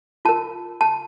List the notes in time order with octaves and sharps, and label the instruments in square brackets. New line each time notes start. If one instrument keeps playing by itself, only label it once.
[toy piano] F4 A#4 A5
A5